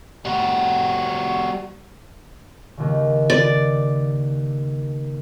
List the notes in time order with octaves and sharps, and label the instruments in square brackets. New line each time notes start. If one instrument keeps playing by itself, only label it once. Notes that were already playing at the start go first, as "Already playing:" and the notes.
[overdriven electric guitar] G3 F#4
[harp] D#2 C#3
[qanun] D5